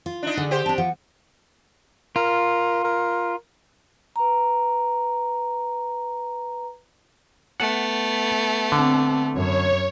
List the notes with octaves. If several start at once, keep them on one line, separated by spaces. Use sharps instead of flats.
F4
D4 D#4
D3 F#4 G#4
G4 C5
C4 D4 A5
F3 F#5
F4 A#4
A#4
B4 A#5
A3 B3 F#5
D3 C4 D4
F#2 C#5